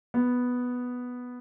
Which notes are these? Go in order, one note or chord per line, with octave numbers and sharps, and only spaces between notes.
B3